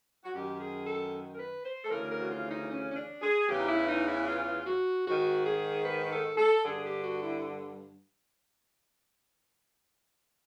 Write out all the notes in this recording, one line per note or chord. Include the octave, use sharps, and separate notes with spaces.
F#4
F#2 D#3 G4
G#4
A4
A#4
B4
C5
A4
D2 C#3 E3 A#4
A#4
F#4
F4
D#4
C#4
C#4
D4
G#4
E2 C#3 E3 G4
D#4
E4
D#4
E4
F4
F#4
G#2 D#3 F#4
G#4
B4
A4
A4
G2 D3 G#4
G4
F#4
E4